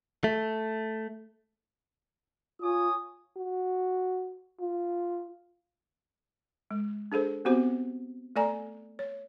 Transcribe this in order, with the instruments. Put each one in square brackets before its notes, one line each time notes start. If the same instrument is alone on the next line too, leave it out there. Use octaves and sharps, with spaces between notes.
[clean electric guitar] A3
[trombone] F4 [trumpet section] C#5 G#5 D#6
[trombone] F#4
F4
[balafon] G#3
D4 G#4 A4 C5
B3 C4 F#4 G4 C5
A3 A4 D5 G#5 A#5
C#5